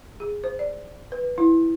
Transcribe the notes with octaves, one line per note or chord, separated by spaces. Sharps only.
G#4
C5
D5
B4
E4